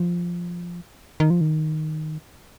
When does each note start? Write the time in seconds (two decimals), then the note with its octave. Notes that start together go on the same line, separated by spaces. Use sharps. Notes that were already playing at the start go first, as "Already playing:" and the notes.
Already playing: F3
1.20 D#3
1.30 F3
1.41 D#3